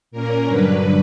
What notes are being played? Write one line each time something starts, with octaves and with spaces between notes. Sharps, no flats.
A#2 A#3 C#4 A#4
G2 D3 F#3 B4